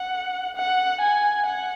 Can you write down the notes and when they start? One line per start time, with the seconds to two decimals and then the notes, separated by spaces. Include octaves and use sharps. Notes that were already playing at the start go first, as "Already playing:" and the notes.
Already playing: F#5
0.56 F#5
1.00 G#5
1.46 F#5